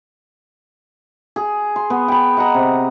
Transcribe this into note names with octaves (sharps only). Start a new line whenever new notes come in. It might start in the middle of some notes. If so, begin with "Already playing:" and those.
G#4
C6
B3
G5 B5
D#5 F#5 A#5
C3